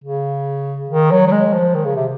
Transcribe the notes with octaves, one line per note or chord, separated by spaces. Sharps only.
C#3
D#3
F#3
F#3
G#3
F3
D#3
C#3
C3